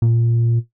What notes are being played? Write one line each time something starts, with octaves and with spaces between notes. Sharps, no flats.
A#2